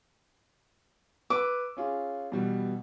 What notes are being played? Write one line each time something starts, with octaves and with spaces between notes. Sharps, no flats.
B4 D6 E6
C#4 F4 G#4
B2 E3 G3